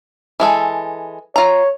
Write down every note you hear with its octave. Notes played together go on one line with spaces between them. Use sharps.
E3 G#3 A4
F4 C#5 A#5